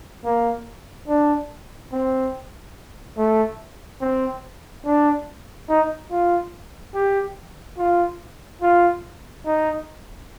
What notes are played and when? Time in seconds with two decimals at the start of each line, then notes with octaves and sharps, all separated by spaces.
0.25 A#3
1.08 D4
1.92 C4
3.17 A3
4.01 C4
4.85 D4
5.69 D#4
6.11 F4
6.95 G4
7.78 F4
8.62 F4
9.46 D#4